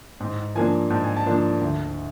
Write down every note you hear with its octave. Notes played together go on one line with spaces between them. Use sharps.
G#2
F3 A#3 D4 G#5
G#2 A5
G#5
A5
F3 A#3 D4
D2